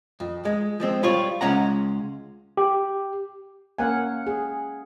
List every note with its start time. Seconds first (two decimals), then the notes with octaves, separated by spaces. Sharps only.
0.20 F2
0.45 G#3
0.80 F3 G#3 C4
1.03 G3 F4 C#5
1.41 C#2 G#3 C#4 F#5 A#5
2.57 G4
3.78 A#3 C#4 F5 F#5 G#5
4.27 G#4